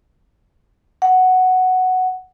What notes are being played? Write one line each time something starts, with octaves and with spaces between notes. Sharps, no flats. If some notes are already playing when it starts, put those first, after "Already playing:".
F#5